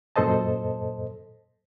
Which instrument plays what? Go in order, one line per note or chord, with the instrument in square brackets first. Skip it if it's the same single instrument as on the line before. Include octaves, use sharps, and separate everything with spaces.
[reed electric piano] F#2 A#2 A4 C5 D#5 A5